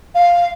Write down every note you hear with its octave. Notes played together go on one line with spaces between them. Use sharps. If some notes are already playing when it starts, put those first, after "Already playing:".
F5